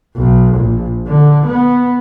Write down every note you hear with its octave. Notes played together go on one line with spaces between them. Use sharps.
B1
A#1
D3
B3